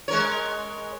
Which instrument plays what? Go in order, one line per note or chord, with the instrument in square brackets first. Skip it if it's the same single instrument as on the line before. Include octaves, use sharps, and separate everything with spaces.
[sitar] G#3 A#4 C#5